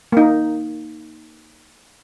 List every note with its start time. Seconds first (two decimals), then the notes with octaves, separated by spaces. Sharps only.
0.12 A#3 D#4